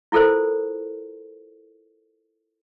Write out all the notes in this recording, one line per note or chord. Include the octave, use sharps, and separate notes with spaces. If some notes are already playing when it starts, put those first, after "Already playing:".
E4 F4 A4 A#4 C5